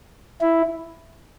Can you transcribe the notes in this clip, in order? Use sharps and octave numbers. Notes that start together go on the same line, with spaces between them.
E4